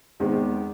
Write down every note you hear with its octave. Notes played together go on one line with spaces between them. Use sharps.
E2 D#3 G#3 C4